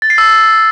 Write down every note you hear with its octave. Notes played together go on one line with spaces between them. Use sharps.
A6
C7
E6